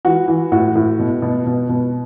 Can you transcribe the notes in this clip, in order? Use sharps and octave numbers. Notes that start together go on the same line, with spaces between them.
E3 F#4
E3
A2 F#4
A2
B2
B2
B2
B2